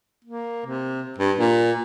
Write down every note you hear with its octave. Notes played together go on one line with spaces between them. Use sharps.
A#3
C3
G2
A#2